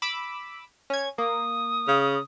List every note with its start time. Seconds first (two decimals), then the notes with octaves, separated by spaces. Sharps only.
0.02 B5 D6 E6
0.90 C#4 G#6
1.18 A#3 D#6
1.88 C#3